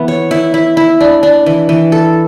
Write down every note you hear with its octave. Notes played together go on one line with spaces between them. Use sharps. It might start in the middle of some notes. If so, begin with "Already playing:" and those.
Already playing: E3 B3 E4
C#5
E4
E4
E4
D4
D4
E3
E3
A4